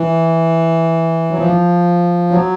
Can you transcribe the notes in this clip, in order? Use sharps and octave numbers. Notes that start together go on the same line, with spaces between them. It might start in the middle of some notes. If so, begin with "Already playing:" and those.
Already playing: E3
F#3
F3
F#3